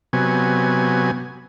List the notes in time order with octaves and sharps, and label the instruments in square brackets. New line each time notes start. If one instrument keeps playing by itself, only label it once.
[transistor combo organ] C3 F#3 B3 G#5